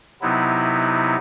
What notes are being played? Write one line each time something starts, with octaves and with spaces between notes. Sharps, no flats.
C3 F#3 B3 D#4 E4